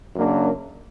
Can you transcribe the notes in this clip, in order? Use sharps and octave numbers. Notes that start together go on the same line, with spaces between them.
F#2 C#3 F#3 A#3 D4